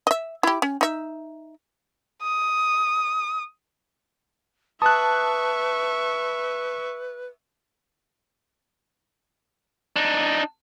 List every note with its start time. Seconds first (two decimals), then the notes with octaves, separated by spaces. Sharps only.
0.07 D#5 E5
0.43 E4 G4
0.62 C#4
0.81 D#4 E5
2.22 D#6
4.82 B4 E5 A5 C#6 D#6 F#6
9.96 D4 D#4